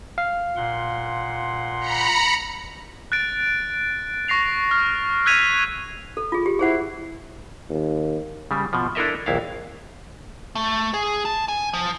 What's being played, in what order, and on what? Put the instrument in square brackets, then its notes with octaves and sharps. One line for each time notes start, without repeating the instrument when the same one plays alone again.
[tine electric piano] F5
[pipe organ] A#2 F#5 C6
[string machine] A#5 B5 C#7
[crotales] F#6 A6 D7
C#6 A#6 C7 F7
F6
E6 F#6 G#6 B6 D#7 F7
[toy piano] A4
F4 G#4
G4
[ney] E4 [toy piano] G#4 C5 F#5
[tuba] D#2
[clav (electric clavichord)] C#3 G3
B2 F3
D4 E4 A4 A#4 D#5 E5
A#1 D#2 E4 F5
[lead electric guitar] A3
G#4
A5
G#5
F3